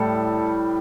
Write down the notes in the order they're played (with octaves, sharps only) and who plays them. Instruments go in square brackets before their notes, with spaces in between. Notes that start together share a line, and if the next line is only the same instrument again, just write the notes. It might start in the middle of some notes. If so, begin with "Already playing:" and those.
Already playing: [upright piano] A2 G3 A4